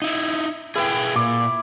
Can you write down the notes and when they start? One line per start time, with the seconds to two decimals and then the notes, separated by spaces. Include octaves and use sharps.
0.02 D#4 E4
0.76 E4 G#4 B4 G5
1.16 A#2 D6